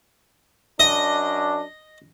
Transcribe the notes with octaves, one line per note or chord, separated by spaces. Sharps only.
F#2 D4 D#5